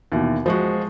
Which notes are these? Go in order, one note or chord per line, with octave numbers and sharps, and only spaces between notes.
D#2 B2 E3
F3 G#3 F#4